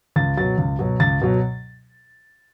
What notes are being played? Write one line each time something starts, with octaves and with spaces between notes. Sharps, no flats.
C#2 A6
B2 F#3 A6
C#2
B2 F#3
C#2 A6
B2 F#3